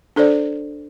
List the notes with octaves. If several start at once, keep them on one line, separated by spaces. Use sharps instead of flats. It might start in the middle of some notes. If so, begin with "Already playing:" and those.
D4 A4 C5 D5